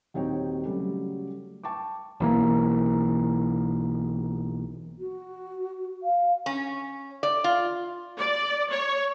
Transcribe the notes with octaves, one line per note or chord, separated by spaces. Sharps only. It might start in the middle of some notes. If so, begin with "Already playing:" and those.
D#1 C4 D#4 F#4 C#5 G5
C#3 F#3 G3 A3
G5 A5 C#6 D6
B1 E3 A#3
F#4
F5
C#4
D5
F4
D5
C#5